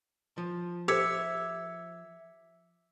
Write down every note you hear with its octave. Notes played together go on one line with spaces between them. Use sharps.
F3
G4 A4 C5 E5 D6 G#6 C#7